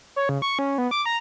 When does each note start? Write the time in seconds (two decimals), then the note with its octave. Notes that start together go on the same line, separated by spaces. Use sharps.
0.16 C#5
0.29 C#3
0.42 C#6
0.59 C#4
0.78 B3
0.91 D6
1.06 A#5